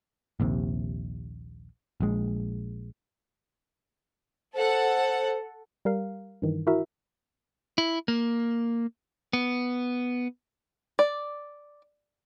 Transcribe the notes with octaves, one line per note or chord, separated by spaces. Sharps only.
A#1 D#2 C3
A#1 G#3
A4 C5 F#5
G3 A#4 F5
G2 D#3 E3
E4 F#4 A#4 E5
E4
A#3
B3
D5